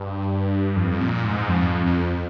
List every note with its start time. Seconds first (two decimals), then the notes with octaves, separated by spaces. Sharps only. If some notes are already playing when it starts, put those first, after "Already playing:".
Already playing: G2
0.76 F2
1.01 A#2
1.25 G#2
1.49 F2
1.86 F2